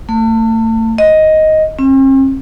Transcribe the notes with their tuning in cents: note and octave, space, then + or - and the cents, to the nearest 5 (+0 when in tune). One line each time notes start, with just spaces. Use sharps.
A3 +35
D#5 +5
C4 +45